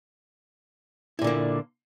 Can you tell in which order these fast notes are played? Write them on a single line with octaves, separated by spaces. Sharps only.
E4 A#2 D3 A#3